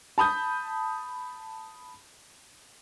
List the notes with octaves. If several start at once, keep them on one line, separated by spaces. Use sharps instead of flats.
A5 B5 D#6 G6